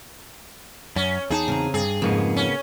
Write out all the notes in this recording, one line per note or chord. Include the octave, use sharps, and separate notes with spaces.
F#2 C#4
E2 D#4 G#4 A5
C#3 C4 A#5
G2 G#4
F2 G#2 C#3 A#3 B3
C#4